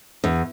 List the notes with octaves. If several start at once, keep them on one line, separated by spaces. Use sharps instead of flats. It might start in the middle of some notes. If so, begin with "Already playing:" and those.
E2